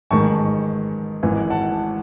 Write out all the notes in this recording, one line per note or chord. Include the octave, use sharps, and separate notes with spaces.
A1 G#2 D#3 G#3 A5 C#6
G#1 G#2 E3
F#5 A5